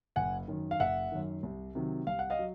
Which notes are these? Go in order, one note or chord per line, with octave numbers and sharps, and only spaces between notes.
F#1 F#5 G#5
F#2 D#3
F5
F#1 E5 F#5
F#2 D#3
C2
C3 D#3 F#3
C2 F5
F#5
D#5 F5
F#3